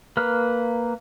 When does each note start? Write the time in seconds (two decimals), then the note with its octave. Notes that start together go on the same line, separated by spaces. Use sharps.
0.17 A#3 B4 F6